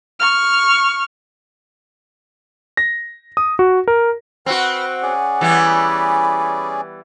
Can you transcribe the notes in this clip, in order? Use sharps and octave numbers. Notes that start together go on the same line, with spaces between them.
C#6 F6
A#6
D#6
F#4
A#4
C4 F#4 B4 F#5 F6
C#4 G#4 D5
E3 G3 B3
B5